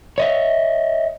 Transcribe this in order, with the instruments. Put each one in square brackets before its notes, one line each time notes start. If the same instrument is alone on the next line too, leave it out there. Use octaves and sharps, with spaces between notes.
[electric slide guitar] C#5 D#5 E5